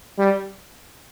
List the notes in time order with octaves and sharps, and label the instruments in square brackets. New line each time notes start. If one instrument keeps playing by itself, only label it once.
[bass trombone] G3